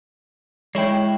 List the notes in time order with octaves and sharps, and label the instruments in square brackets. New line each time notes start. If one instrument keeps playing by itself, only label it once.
[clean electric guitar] G#3 E4 [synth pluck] C#5 G5